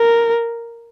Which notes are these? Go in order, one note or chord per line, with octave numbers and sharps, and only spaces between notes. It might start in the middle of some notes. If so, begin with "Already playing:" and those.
Already playing: A#4